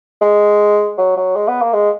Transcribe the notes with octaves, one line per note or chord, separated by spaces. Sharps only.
G#3
F#3
F#3
G#3
B3
A#3
G#3